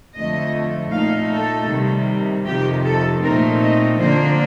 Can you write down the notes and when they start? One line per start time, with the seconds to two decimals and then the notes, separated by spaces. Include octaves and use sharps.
0.17 F2 D3 A3 D#5
0.93 A#2 A3 D#4 F5
1.32 A4
1.71 C3 D#3 G3
2.47 F2 C3 D#3 G4
2.85 A4
3.23 A#2 A3 C4 D#4 A#4
3.62 D#5
4.00 D3 F3 A#3 D4 C5